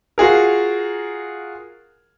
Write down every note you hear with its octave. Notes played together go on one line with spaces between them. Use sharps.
F4 F#4 G#4 A#4